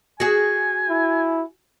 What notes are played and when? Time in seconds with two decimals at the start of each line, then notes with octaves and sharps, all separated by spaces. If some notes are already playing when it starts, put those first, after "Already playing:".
0.20 F#4 G#4 G#5
0.89 E4